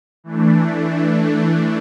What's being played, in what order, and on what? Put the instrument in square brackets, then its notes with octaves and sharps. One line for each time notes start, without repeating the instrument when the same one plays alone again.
[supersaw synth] E3 A3 D4